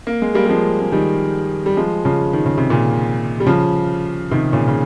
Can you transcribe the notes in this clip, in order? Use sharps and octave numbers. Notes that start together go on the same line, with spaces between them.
A#3
G#3
G3 A#3
G3
F3 G#3
G#3
D#3 G3
G3
F3 G#3
C#3 F3
D#3
C#3
C3
A#2 C#3
G3
C#3 F3
C3 D#3
A#2 C#3
C#3